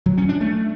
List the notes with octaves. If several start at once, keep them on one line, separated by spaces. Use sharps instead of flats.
F#3
C#4
D4
A3